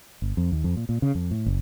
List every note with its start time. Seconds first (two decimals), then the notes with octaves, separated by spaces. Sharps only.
0.22 G1
0.37 F2
0.52 D#2
0.64 F2
0.76 A#2
0.89 A#2
1.02 C#3
1.15 F2
1.31 A2
1.46 F#1